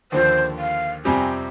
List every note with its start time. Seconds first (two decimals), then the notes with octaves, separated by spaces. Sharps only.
0.12 D#2 D3 F3 C5
0.59 F5
1.05 F2 C3 G3 C4 G4 G#5